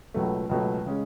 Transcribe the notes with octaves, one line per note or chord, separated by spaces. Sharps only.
C#2 B2 F#3 A3
C#2 B2 F#3 A3
C#3 G#3 C#4